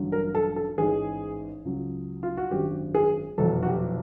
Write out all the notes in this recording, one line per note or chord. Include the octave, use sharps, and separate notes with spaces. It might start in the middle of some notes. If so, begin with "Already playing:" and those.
Already playing: A1 G2 D3 F#3
A#4
A4
A4
A1 G#2 E3 G#3 G#4
C#2 C#3 F#3
F4
F#4
G#1 F#2 D3 G4
G#4
F1 E2 B2 F#3 A4
F#4
G4